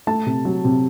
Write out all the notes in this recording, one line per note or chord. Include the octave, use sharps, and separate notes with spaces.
A3 A5
C3
F#3
C3